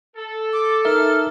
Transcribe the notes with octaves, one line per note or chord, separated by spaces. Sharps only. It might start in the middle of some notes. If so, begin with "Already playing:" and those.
A4
D6
D#4 A#4 E5 F6